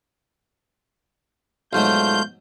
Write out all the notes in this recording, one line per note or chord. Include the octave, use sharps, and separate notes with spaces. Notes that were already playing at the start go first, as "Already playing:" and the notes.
B1 G#2 F#3 A3 F4 F5 G6